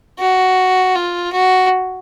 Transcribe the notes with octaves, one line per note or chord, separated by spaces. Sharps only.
F#4
F4
F#4